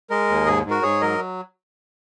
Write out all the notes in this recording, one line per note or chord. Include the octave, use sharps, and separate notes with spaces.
G#3 A#4 D#5
D#2
G#2 G#4
G#2
F#4 A#4
G#2 G#4 C#5
F#3 A#4 D#5